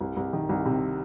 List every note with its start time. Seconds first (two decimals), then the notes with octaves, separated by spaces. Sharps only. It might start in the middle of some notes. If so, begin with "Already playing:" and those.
0.01 C2
0.17 C2
0.33 D#3
0.49 C2
0.65 C3